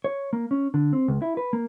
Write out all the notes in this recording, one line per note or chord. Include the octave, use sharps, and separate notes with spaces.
C#5
A#3
C#4
D3
C4
C#2
E4
B4
A#3